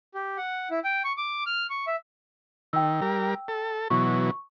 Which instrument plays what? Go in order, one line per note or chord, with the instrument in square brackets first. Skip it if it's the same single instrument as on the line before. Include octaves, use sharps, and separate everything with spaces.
[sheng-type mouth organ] G4
F#5
E4
G5
C#6
D6
F6
C#6
E5
[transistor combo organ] D#3 [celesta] G5 E6
[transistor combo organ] G3 A#4
A4
[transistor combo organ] B2 E3 F#3 [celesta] C#6